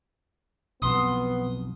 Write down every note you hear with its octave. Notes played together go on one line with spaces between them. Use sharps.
B1 F2 B3 C6 D#6